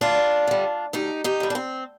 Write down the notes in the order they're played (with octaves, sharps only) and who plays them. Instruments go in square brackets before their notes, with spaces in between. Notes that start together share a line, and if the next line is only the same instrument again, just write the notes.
[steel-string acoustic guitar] D2 D4 F4
D3 G3
D2 D#4 G4
D#4 G4
D3 G3
D4
C4